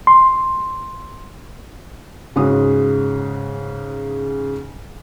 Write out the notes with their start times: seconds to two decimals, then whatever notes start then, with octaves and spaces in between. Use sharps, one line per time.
0.07 C6
2.36 G#2 C#3 G#3 F#4 D#6